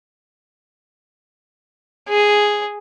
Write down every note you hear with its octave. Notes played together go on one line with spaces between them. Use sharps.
G#4